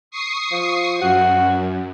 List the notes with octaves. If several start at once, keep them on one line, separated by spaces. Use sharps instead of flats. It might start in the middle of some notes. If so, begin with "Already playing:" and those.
C#6 D#6 C7
F3
F#2 F#4